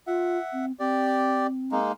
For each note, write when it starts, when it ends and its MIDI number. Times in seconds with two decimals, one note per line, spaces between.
0.07 0.38 65
0.07 0.66 76
0.07 0.66 78
0.53 0.72 60
0.79 1.78 60
0.79 1.47 67
0.79 1.47 74
1.72 1.92 56
1.72 1.92 58
1.72 1.92 63